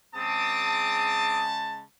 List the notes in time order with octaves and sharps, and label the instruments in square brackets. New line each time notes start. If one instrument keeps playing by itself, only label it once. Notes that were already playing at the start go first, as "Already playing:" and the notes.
[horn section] C#3 G#3 A5 [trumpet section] C4 D6 D#6